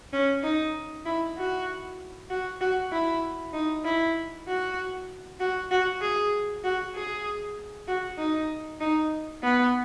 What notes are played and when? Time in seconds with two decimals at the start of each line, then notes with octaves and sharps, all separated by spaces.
0.13 C#4
0.44 D#4
1.06 E4
1.37 F#4
2.30 F#4
2.61 F#4
2.92 E4
3.53 D#4
3.85 E4
4.48 F#4
5.40 F#4
5.71 F#4
6.01 G#4
6.64 F#4
6.95 G#4
7.88 F#4
8.18 D#4
8.81 D#4
9.43 B3